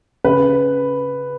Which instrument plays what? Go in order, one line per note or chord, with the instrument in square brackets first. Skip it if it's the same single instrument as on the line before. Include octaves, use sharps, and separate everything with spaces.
[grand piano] C#3 B4